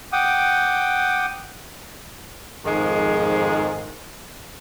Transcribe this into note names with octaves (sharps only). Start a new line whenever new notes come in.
F#5 G5 D6 D#6
F2 G#2 D#3 F3 G#3